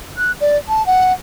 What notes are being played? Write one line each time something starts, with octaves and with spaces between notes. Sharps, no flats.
F#6
D5
A5
F#5